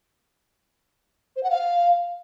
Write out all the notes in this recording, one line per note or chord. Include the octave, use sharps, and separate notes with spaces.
C5
F#5
F5